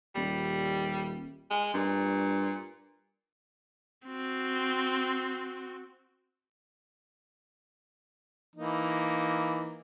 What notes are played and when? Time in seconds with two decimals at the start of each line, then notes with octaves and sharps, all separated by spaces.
0.15 D#1 G3
1.51 G#3
1.74 G2 A#2
4.07 C4 F#4
8.56 E3 A#3 D#4